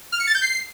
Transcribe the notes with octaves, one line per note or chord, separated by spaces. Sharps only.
F6
C#7
A6
G6
C7